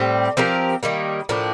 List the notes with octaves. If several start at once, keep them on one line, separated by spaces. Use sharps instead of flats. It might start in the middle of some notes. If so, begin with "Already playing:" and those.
Already playing: A2 G3 C4
F3 C4 G4 A#4
D#3 G3 A#3
A2 F3 A#3 D4